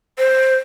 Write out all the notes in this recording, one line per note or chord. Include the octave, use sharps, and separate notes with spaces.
C5